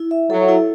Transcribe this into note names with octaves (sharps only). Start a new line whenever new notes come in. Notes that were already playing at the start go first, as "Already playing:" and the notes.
Already playing: E4
E5
F#3 A4
E4